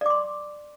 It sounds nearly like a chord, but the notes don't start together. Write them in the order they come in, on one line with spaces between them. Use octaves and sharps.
D5 D6 C6